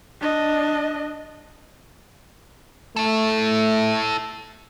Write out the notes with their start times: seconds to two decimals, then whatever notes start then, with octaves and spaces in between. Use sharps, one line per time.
0.20 D4 D#5
2.96 A3 E4 A4